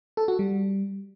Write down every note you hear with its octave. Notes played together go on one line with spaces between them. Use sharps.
A4
F#4
G3